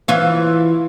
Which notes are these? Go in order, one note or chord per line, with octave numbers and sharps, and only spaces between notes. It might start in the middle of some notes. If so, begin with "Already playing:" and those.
E3 F4 C#5